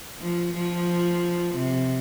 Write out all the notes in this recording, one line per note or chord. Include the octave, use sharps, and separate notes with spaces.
F3
F3
C3